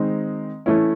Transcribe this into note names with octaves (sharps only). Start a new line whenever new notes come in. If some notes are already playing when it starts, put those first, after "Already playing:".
Already playing: D#3 G#3 C4 D#4
E3 A3 C#4 E4